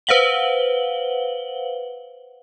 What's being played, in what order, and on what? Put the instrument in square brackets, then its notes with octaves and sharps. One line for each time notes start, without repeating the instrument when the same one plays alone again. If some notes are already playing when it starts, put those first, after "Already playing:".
[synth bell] B4 C5 F5 F#5 F#7 G7